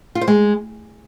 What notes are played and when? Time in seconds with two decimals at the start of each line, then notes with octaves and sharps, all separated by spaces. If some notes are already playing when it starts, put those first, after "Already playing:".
0.15 F4
0.21 C5
0.28 G#3